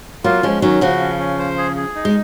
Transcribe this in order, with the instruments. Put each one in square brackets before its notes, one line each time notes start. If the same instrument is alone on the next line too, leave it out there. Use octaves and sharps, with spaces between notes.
[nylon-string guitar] F#3 A#3 [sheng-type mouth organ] F4
[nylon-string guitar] F3 G#3 [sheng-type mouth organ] C#4
[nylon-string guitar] D#3 F#3 [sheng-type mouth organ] C#4
[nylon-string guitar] C#3 F3 [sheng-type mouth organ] F#4
[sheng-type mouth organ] C#4
C#4
C5
G#4
G#4
D#4
[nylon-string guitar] G#3